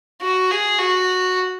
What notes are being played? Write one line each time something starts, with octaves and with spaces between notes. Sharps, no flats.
F#4
G#4
F#4